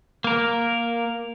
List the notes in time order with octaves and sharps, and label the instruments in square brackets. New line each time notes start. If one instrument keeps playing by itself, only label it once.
[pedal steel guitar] A#3 A#4